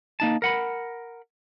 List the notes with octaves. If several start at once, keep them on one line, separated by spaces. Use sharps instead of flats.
A#3 D#4 A5
A#4 F#5 B5